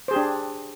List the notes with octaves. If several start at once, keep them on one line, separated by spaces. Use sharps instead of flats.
D4 G4 G#4 C5